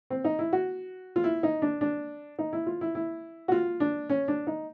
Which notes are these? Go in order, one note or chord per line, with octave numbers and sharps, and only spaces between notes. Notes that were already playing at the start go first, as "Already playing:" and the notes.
C4
D#4
E4
F#4
F4
E4
D#4
D4
D4
D#4
E4
F4
E4
E4
F#4
F4
D4
C#4
D4
D#4